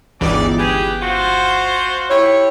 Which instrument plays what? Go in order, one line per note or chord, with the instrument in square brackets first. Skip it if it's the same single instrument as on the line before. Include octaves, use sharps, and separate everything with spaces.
[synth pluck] G1 C#2 E3 [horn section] D4 D#4 D5
[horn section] G4 G#4 B4
F4 F#4 C5
[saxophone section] E4 G4 C#5